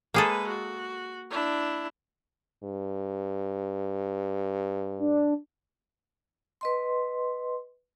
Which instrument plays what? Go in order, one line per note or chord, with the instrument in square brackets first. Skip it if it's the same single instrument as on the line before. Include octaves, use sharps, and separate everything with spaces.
[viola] G#3 B4 [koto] A#3 G#4 A4
[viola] F#4
D4 E4
[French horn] G2
[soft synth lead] D4
[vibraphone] B4 D#5 C6